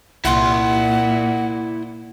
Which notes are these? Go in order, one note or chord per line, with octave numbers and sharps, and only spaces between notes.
C2 A#2 E4 F#5 C6